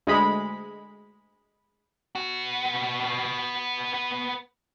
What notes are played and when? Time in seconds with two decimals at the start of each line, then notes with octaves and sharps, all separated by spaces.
0.07 D2 G#3 B5
2.15 B3 F#4